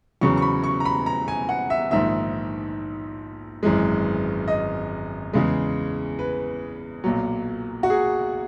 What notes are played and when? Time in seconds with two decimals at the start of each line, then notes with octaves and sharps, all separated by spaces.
0.21 E2 C#3 F#3 C#6
0.37 C#6
0.42 B5
0.64 C#6
0.80 A#5
0.85 B5
1.06 A#5
1.28 G#5
1.49 F#5
1.70 E5
1.91 A#1 G#2 D#3 E5
3.63 G#1 F#2 E3 G#3
4.48 D#5
5.33 E2 C#3 G#3
6.19 B4
7.04 B1 A#2 F#3
7.83 F#4
7.90 G#4